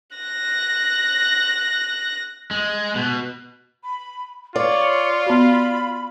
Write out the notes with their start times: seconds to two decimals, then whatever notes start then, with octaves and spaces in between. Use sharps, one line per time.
0.17 F#6 A#6
2.51 G#3
2.95 B2
3.84 B5
4.56 F4 C#5 D5
5.26 B3 F#4 B5